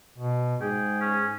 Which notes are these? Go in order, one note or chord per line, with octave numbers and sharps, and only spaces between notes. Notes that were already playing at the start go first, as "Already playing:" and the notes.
B2
G#2 G#4 G5
C#4